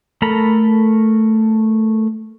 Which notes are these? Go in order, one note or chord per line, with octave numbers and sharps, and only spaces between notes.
A3 A4 A#4 A#5 B5